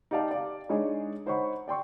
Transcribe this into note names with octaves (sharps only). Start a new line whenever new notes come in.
D#4 G4 D5 F5 A5
D5 F5
G#3 D4 D#4 G#4 C#5
D#4 C5 C#5 F#5 B5 C#6
D5 G5 C6 C#6